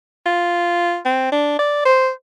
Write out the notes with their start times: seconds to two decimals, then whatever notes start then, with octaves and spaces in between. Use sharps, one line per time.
0.26 F4
1.06 C4
1.32 D4
1.59 D5
1.86 C5